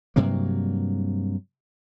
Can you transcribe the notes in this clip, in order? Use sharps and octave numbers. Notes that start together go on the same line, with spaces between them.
G2 C3 F#3 A#3